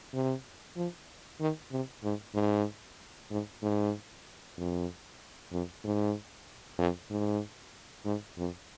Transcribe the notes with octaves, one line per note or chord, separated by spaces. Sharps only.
C3
F3
D#3
C3
G#2
G#2
G#2
G#2
F2
F2
G#2
F2
G#2
G#2
F2